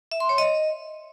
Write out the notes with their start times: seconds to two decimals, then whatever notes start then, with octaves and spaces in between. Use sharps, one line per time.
0.12 E5
0.20 C6
0.29 C#5
0.38 D#5